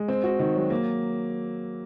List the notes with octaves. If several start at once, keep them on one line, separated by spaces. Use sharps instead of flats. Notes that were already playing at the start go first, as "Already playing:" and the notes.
Already playing: G#3
C4
F#4
D#3
F#3
A#3